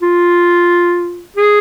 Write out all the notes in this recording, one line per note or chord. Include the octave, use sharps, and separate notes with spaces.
F4
G#4